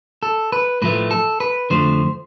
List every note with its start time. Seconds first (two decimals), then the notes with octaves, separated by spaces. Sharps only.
0.23 A4
0.52 B4
0.82 A2 F3 A3 B4
1.11 A4
1.40 B4
1.70 F2 D3 F3 A3 C5